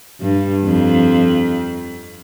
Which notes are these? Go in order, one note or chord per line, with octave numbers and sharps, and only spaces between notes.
G2
F2